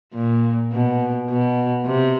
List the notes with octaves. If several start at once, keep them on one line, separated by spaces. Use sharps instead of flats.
A#2
B2
B2
C3